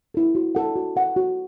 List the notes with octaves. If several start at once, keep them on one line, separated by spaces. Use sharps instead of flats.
E4 A4
F#4
A4 F#5
F#4
A4 F#5
F#4